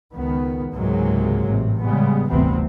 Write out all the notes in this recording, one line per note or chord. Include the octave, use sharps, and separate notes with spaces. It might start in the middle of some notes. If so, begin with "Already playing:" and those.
C#2 D#3 B3
C#2 G#2 C3 F#3 G#3 A#3
A1 C3
C#3 G3 G#3 B3
G1 D2 C3 E3 B3 C4